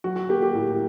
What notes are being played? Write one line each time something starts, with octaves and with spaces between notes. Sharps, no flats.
F#3 F#4
F#4
A#3 G4
G4
A2